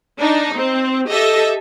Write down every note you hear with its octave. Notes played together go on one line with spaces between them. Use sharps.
D4 D#4
C4
G4 A4 D#5 E5